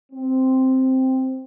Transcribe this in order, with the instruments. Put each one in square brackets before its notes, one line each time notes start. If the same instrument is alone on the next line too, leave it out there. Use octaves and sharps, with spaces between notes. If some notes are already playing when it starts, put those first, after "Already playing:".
[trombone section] C4